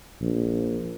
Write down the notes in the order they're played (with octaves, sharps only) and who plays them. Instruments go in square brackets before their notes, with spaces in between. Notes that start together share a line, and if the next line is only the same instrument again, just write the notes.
[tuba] A#1